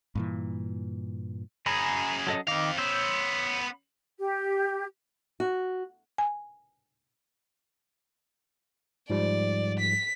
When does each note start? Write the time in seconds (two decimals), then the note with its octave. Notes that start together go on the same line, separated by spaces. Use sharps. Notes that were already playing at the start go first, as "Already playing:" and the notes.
0.15 G2 A#2 E3
1.66 F#2 G#4 G#5 A#5 B5
2.27 F#3 A4 D#5
2.48 D#3 C4 D#5 F5 D6
2.78 B3 C5 C#5 E6 G6
4.18 G4
5.40 F#4
6.18 G#5
9.10 G#2 F3 G3 D5
9.80 B6